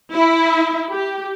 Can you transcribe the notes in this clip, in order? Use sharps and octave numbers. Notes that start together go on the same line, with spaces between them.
E4
G4